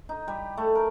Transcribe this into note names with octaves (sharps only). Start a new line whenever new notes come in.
D#4
G3
A3
A#4